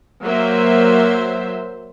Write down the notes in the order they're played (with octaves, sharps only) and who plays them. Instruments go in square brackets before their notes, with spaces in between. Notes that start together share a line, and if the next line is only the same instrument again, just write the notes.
[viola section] F#3 A#3 C5 E5